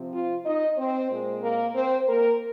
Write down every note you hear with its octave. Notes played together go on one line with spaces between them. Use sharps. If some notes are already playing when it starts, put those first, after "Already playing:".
Already playing: C3 F3 C4
F4
D#4 D#5
C4 C5
A#2 G#3 C4
A#3 A#4
C4 C5
A#3 A#4